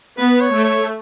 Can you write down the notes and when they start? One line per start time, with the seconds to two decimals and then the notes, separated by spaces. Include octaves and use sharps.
0.18 B3 B4
0.41 C#5
0.53 A3
0.64 C#5